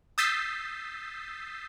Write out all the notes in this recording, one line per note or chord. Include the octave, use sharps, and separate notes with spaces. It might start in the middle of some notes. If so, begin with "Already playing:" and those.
D#6 E6 G6 A6 B6 C7